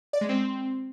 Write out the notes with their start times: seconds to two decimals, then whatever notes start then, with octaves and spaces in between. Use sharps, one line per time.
0.13 D5
0.21 G#3
0.29 C4